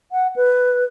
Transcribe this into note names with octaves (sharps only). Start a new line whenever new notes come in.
F#5
B4